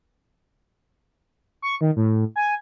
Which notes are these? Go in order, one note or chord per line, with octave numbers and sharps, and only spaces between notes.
C#6
D#3
A2
G#5